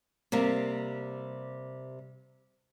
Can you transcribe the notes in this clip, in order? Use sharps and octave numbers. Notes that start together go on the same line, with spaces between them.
C3 G3 A#3